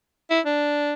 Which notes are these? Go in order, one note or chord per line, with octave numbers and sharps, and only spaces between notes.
E4
D4